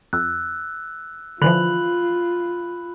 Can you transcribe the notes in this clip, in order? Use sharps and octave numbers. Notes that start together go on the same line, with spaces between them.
F2 E6 F#6
D3 E3 F3 F4 B5 F#6 F#7